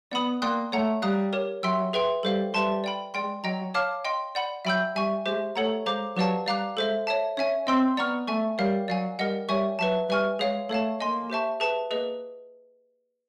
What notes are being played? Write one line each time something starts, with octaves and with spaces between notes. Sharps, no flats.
B3 D5 F#5 B5 D#6
A#3 D5 G5 C6 D#6 F#6
A3 C#5 F#5 A#5
G3 F5 A#5 D#6 F#6
G4 A#4 C#5
F#3 E5 G5 C6 E6
G#4 B4 E5 G5 C6
G3 A4 C5 F5
G3 B4 E5 A5 C6
D5 G5 B5
G#3 D5 G5 C6
F#3 D#5 G5 A#5
C#5 F5 A5 D6 F6
D#5 G5 C6
D5 F#5 B5
F#3 E5 G5 B5 E6 G6
G3 E5 G#5 C#6
G#3 G4 C5 E5
A3 A4 C#5 F#5 A#5
G#3 C5 F5 A#5 D6
F#3 G4 B4 D5 F5 A5
G3 D5 F5 A#5 D6 F#6
G#3 A4 C5 E5
C#5 E5 A5
C#4 C#5 E5 G#5
C4 D#5 G5 C6 E6
B3 D5 F#5 A#5 C#6 F6
A3 E5 G#5 C#6
G3 A#4 C#5 F5
F#3 D5 F5 G#5
G3 A#4 D#5 F#5
G3 C#5 E5 G#5 C#6
F#3 B4 E5 A5
G3 B4 E5 G#5 C#6 F6
G#3 G#4 C#5 F5
A3 A4 C#5 F5 A5
A#3 D#5 G#5 C6
G4 C5 E5 A5 C#6
G#4 B4 E5 A5
A#3 G#4 B4 D#5